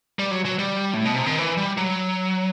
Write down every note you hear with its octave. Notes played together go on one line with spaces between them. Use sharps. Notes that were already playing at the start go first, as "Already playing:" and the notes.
G3
F#3
F#3
G3
A2
B2
C3
D#3
E3
G3
F#3